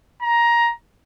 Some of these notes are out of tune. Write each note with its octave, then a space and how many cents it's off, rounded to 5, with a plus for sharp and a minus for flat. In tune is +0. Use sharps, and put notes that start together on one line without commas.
A#5 +15